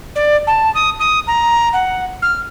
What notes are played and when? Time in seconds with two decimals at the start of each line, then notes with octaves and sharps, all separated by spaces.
0.15 D5
0.47 A5
0.74 D#6
0.99 D#6
1.27 A#5
1.73 F#5
2.22 F6